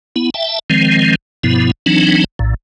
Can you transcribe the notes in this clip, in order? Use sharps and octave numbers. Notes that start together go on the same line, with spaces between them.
B3 E4
E5 G5 A5
D#3 F3 G#3 C4
G2 B2 F3 B3 E4
E3 F#3 C4 D4 D#4
A#1 A2